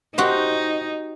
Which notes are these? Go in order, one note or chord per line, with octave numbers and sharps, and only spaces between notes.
D#4 F#4 G4 C5